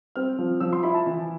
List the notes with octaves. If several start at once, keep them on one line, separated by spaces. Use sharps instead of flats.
C4 F6
F3
F3 E6
C6
E4 B5
A5
E3